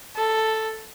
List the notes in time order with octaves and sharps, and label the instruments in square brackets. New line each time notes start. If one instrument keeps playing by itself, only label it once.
[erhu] A4